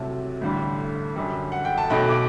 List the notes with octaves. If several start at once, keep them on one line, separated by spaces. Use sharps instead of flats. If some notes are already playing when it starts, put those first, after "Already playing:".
Already playing: C2 C3 F#3 A3 A5
A1 G2 D3 G3
F#2 D3 G3
F#5
G5
A5
B1 B2 A3 G5 B5
D6